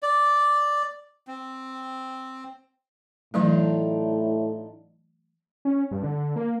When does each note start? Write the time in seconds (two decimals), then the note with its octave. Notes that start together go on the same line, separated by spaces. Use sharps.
0.03 D5
1.27 C4
3.34 A2 E3 F#3 A3 D4 D#4 F4
5.65 C#4
5.91 G2
6.03 D3
6.36 A#3